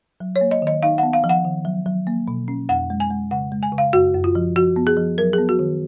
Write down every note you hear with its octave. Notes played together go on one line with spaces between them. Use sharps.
F#3
C#5
A#3
D#5
D#3 D#5
D#4 F5
F#5
B3
F5
F3
F#5
D#3
F#3
F#3
A#3
B2
C#4
F2 F#5
G#3
G#5
G#3
C#3 F#5
G#3
G#5
C#3
F5
F#2 F#4
F#2
F4
F3
F3 F#4
B3
G#4
F3
F#3 A#4
G#4
B3
F#4
D#3